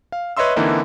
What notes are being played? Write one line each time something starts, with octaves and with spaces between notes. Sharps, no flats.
F5
B4 C#5 D#5 E5 C6 E6
D3 E3 A#3 C4 D#4 E4